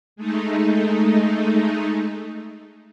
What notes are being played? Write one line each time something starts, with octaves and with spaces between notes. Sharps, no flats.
G#3 A3 D#4